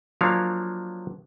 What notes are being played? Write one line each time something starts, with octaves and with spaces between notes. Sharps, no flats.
F3 F#3 A#3 D4 C#5 F5